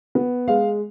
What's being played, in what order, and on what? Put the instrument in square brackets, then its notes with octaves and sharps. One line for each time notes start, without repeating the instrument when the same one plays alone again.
[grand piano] B3
G#3 F5